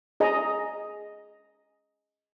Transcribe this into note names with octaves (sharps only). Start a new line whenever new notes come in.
G#4 D#5 A#5